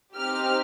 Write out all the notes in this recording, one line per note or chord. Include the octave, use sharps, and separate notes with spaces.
C4 D#4 G4 F6